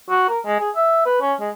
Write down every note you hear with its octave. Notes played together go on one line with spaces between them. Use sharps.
F#4
A#4
G#3
G#4
E5
B4
C#4
G#3